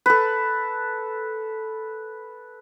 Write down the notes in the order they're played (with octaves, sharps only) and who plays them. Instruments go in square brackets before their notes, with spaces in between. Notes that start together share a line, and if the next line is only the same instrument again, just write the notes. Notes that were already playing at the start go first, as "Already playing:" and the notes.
[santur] A4 B4